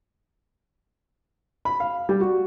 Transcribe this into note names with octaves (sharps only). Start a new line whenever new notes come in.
B5
F5
G3
F#4